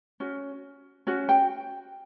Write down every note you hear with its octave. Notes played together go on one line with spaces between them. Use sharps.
C#4 F#4
C#4 F#4
G5